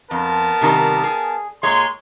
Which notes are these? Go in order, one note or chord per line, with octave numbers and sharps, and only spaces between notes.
F2 B3 A#4 A5
C3 D#3 G3
G#4
A#2 G#3 C#5 C6